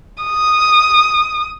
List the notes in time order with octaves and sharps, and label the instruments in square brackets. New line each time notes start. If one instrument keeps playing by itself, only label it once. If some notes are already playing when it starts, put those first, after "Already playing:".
[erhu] D#6